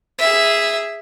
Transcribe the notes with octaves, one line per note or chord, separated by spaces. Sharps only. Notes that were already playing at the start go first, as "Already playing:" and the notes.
G#4 E5